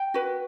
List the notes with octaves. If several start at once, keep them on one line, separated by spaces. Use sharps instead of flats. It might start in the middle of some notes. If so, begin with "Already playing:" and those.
Already playing: G5
F#4 B4